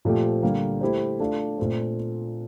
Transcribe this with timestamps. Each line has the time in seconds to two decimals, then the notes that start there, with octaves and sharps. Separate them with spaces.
0.05 A#2 F3 A3 C4 G4
0.43 D3 G3 A#3
0.81 A3 E4 G4 C5
1.19 A3 D4 F4
1.58 A#2 A3 C4